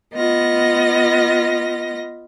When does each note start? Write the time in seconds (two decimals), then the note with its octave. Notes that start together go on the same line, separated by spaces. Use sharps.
0.15 B3 F4 D#5 A#6